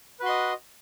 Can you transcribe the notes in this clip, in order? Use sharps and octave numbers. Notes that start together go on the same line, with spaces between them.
F#4 B4 D#5 C6